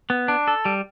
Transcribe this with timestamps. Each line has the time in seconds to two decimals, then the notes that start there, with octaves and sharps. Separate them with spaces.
0.10 B3
0.28 D4
0.48 A4
0.65 G3